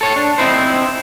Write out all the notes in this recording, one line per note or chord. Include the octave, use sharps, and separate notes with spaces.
A4 C#5
D4
C4 D#4 E4 C5